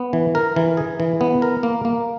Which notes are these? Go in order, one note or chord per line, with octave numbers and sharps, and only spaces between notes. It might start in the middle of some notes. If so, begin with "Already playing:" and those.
Already playing: B3
E3
A#4
E3
G#4
E3
B3
A#4
A#3
A#3